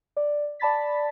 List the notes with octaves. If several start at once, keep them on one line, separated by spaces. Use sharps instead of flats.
D5
D5 A5 B5 A6 B6